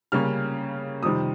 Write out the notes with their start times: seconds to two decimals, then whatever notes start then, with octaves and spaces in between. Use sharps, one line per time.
0.12 C#3 G3 A#3 C#4 F6
1.03 F2 C3 D#3 G3 D#6